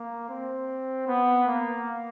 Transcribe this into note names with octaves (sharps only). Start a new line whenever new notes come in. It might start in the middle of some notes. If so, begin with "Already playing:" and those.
Already playing: A#3
C4
B3
A#3